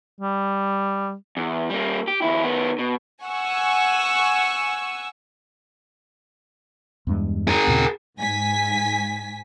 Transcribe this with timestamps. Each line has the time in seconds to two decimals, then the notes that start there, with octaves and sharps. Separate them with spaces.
0.21 G3
1.37 E2
1.70 G3 A#3
2.08 G4
2.22 D#2 E4
2.43 D#3 B3
2.79 B2
3.22 F#5 G#5 C#6 E6
7.07 E2 G2 G#3
7.48 G#4 A#4
7.67 D#2 A#2 C#3
8.19 G#2 G#5 B6